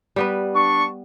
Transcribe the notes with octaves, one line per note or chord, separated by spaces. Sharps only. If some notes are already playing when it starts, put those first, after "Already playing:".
G3 B3 B4
D4 C#6